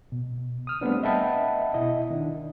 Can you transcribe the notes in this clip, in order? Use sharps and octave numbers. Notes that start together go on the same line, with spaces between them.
B2
D#6 F6
G3 A3 B3 C4 D4
D#5 E5 F#5 G5 A5 B5
B2 E4 D#5
D#3 D4